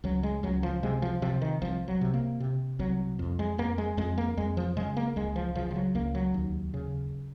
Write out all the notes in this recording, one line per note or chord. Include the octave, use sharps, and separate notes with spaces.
C#2 F#3
G#3
C#2 F#3
F3
C3 G#3
F3
C3 F3
D#3
C2 F3
F#3
C3
A#3
C3
C2 F#3
F2
G#3
F2 A#3
G#3
F2 G#3
A#3
F2 G#3
F3
C#3 G#3
A#3
C#2 G#3
F3
C#3 F3
F3
F#3
C#2 A#3
F#3
D#2
C#3